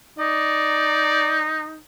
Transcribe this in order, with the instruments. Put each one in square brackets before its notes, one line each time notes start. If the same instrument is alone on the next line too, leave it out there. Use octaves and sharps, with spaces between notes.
[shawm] D#4 [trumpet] D5